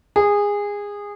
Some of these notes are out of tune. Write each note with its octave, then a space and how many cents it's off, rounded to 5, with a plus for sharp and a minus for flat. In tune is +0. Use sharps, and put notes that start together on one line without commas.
G#4 -20